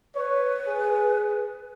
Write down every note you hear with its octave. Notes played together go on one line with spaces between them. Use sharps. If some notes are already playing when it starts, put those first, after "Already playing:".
B4 C#5
G#4